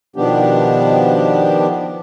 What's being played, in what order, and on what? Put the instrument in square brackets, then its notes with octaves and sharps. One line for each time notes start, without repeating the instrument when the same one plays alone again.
[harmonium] B2 D#3 F3 B3 D4 G4